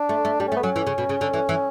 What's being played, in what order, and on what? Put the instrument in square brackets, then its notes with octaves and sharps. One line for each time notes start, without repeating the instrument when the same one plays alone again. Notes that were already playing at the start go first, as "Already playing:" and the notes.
Already playing: [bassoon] D4
[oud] A3
A3
[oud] G3 [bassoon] D4
[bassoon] C#4
[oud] A3
[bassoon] B3
[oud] F#3 [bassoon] C#4
[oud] E3
C#3
B2
C#3
D3
E3
E3